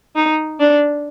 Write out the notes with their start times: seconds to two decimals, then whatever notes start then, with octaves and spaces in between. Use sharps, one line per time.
0.16 D#4
0.60 D4